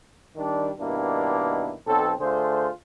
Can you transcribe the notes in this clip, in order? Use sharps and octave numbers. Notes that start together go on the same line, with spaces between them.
D#3 G3 D4
G2 B2 D#3 A#3 D4 E4
B1 C4 A4
D3 A3 F4 G#4 C5